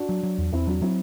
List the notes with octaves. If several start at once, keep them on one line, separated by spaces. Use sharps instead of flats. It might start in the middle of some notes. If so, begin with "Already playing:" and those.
Already playing: D4 F#4
F#3
F#3
E2
E2 C4 E4
F#3 D4 F#4
F#3 C4 E4